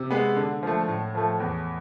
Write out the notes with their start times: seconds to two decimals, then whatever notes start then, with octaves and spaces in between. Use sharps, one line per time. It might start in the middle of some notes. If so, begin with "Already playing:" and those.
Already playing: C3
0.10 G#3 B3
0.36 D3
0.63 F3 A3
0.88 A2
1.15 F3 A3
1.40 E2